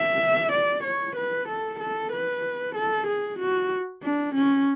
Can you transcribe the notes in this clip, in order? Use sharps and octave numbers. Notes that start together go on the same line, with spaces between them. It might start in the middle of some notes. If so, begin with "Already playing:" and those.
Already playing: E5
D5
C#5
B4
A4
A4
B4
A4
G#4
F#4
D4
C#4